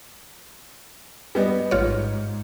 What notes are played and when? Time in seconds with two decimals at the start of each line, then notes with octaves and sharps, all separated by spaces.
1.35 G3 B3 D#5
1.71 A1 G#2 F4 C#5